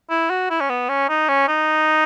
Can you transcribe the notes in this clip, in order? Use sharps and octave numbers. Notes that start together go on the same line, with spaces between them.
E4
F#4
E4
C#4
B3
C#4
D#4
C#4
D#4